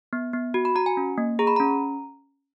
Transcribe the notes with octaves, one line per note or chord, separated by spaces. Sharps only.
B3
B3
F#4
B5
F#4 A#5
G#5
C#4
A#3
G#4 A#5
B5
C#4 A#5